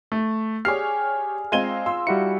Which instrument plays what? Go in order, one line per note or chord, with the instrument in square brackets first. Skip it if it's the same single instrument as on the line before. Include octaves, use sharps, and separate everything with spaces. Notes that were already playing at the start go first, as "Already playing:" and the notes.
[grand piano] A3
[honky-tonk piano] G4 C#5 [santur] G#4 D5 F#5 [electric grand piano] F6 [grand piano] C7
[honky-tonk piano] G#3 C4 [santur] F4 A#5 [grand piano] G#6 D#7 G7
[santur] F4 [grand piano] C6 [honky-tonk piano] E6
[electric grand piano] G3 F#4 C#7 [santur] E4